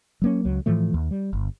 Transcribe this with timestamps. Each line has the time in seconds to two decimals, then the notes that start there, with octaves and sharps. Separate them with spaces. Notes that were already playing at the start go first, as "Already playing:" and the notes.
0.22 F#3 A#3 C#4
0.45 C#2 F#3
0.66 A2 E3 F3 A3
0.94 D#2
1.11 G3
1.33 G1